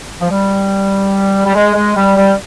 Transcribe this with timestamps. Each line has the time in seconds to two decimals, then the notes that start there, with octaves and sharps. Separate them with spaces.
0.21 F3
0.30 G3
1.46 G3
1.55 G#3
1.75 G#3
1.96 G3
2.16 G3